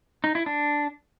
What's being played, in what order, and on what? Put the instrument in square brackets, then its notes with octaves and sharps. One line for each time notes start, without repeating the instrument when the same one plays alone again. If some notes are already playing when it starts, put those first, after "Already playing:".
[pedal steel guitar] D#4
E4
D4